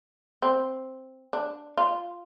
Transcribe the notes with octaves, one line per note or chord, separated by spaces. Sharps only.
C4
D4
F4